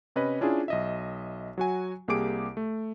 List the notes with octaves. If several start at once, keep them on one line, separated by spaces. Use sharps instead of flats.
C3 C#4 B4 D#5 B5
C#4 D4 E4 F4 G#4
B1 D#5 E5
F#3 F#4 G#5
C2 A#3 G4 G#4 D6 D7
A3